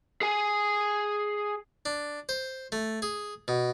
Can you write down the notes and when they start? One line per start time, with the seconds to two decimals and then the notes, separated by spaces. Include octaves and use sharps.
0.21 G#4 G#5
1.86 D4
2.29 C5
2.72 A3
3.02 G#4
3.48 B2